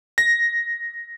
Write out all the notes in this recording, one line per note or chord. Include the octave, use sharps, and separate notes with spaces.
A#6